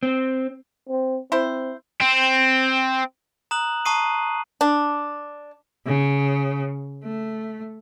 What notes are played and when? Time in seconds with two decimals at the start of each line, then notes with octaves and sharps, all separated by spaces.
0.03 C4
0.89 C4
1.32 C4 E4 C5
2.01 C4
3.51 A#5 D#6 F#6 F#7
3.85 A5 A#5 C#6 D#6 C7 D#7
4.61 D4
5.86 C#3
7.04 A3